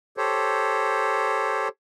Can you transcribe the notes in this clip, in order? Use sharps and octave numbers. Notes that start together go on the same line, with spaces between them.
G4 A4 C5 C#5